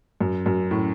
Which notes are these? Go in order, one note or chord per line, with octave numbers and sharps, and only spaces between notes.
F#2
F#2
A2